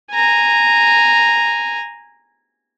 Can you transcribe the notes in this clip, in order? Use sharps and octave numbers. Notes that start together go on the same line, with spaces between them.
G#5 A#5